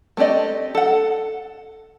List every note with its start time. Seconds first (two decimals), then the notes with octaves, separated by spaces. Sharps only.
0.17 A3 C4 G4 D5 D#5
0.75 A4 F#5